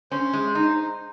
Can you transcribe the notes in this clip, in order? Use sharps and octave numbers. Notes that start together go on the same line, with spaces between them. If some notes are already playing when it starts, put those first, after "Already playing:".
C#4 C5
G#3
D#4